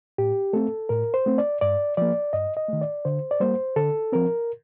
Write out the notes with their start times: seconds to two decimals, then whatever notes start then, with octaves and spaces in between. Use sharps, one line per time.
0.18 A2 G4
0.53 A3 C4 A4
0.89 A2 A#4
1.14 C5
1.26 A3 C4
1.38 D5
1.61 G2 D5
1.97 F3 A#3 D5
2.33 G2 D#5
2.57 D#5
2.69 D#3 A3
2.81 D5
3.05 D3 C5
3.31 D5
3.40 G3 A#3 C5
3.76 D3 A4
4.12 F3 C4 A#4